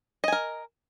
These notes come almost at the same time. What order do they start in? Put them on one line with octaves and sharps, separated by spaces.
D#5 G#5 A#4